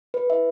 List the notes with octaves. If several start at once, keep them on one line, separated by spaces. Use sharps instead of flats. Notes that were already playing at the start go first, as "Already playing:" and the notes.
B4
E4 A4 E5